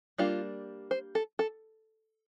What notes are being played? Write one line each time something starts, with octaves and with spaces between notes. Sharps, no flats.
G3 A#3 D4 F4
C5
A4
A4